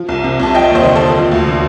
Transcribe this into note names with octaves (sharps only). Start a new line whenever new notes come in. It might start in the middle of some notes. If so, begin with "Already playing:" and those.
Already playing: F3
C2
C3
C2 A5
F3 D#5 G5
D#2
C5 D#5
D3
A4 C5
D#2
F3
D2
D3